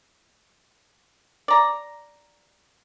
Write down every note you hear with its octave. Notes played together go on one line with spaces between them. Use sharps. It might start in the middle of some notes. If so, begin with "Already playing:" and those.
D5 A#5